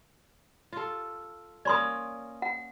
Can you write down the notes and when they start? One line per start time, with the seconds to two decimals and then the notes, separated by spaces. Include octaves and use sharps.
0.73 F4 A4
1.65 A#3 C#4 D5 C6 D#6
2.42 F#5